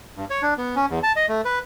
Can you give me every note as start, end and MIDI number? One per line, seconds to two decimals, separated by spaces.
0.16 0.25 43
0.30 0.42 73
0.42 0.54 62
0.57 0.75 59
0.76 0.86 61
0.90 0.99 40
1.03 1.12 81
1.16 1.26 75
1.29 1.41 57
1.45 1.59 71